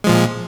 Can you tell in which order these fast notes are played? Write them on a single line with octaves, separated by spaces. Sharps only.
G#3 F3 A#2